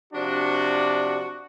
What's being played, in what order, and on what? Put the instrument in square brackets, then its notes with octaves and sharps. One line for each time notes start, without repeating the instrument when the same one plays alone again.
[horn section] C3 F3 D4 [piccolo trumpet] F#4